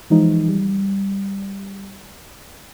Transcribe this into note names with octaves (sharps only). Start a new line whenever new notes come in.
E3 F3 G#3 D#4
G3